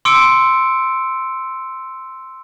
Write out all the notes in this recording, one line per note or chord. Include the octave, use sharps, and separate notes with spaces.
C6 D6 E6 C#7 D7